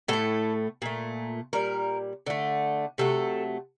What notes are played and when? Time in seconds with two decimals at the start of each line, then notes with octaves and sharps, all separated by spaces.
0.08 A2 A3 A4
0.82 A#2 A3
1.53 A#2 G3 A#4
2.26 D3 A3
2.98 C3 F#3 A3 A4